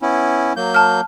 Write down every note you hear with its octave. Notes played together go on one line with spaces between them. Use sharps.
B3 C#4 E4
F#3 A#3 G6
A5 F6